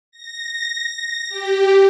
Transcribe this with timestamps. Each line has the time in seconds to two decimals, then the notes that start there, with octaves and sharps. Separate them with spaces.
0.12 A#6
1.29 G4